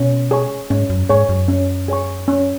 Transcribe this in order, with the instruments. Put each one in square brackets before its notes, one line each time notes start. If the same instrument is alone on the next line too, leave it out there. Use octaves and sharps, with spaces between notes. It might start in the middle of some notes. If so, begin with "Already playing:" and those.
Already playing: [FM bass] B2 [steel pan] C#4
[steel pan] G#4 C#5 G#5 C#6
[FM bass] G#2 [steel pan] C#4
[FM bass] F#2
[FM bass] G#2 [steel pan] G#4 C#5 G#5 C#6
[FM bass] F#2
[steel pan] C#4
G#4 C#5 G#5 C#6
C#4